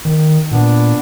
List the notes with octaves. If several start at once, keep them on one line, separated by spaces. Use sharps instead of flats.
D#3
A#2 B3 D4